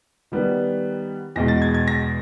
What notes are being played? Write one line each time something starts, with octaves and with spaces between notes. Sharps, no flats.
D#3 G3 B3
E2 B2 G#3 A#6
A6
G#6
G#6
A#6